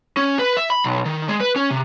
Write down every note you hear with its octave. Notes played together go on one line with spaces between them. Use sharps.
C#4
B4
E5
B5
B1
D#3
G#3
B4
C#4
C3